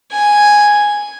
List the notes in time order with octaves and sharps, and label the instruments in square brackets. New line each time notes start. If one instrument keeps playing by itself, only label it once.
[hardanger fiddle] G#5